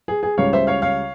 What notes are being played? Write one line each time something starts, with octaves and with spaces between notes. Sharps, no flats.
G#4
G#4
C#2 C#3 G3 C#5 F5
C5 E5
C#5 F5
C#5 F5